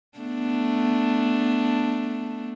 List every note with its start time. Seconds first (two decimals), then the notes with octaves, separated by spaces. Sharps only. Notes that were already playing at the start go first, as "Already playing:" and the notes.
0.18 A3 B3 D4